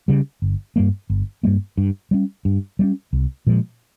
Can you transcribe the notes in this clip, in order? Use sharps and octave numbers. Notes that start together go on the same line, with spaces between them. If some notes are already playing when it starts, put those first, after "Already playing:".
C#3 G3
G1
G2 G3 A#3
G1
G2 G3 A#3
G2
G3 A#3 C#4
G2
G3 A#3 C#4
C2
A#2 F3 G#3